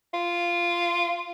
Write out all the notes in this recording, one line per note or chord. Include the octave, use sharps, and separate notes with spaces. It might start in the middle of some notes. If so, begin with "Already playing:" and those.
F4